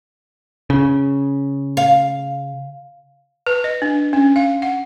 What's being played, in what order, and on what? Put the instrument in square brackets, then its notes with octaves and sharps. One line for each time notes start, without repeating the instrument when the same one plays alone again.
[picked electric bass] C#3
[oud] F5
[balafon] B4
D#5
D4
C#4
F5
F#5